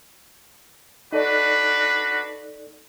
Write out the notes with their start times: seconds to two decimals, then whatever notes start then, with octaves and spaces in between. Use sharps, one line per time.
1.13 D4 D#4 F#4 A4 B4 D5